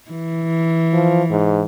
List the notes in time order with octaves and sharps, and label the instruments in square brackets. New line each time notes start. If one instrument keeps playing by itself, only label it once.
[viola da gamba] E3
[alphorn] F3
G#2